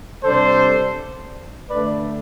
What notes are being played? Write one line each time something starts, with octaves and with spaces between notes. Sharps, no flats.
C3 G3 D4 A4 C5
D3 A3 D4 B4 D5